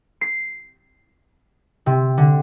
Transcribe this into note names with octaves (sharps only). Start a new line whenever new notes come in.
C7
C3
D3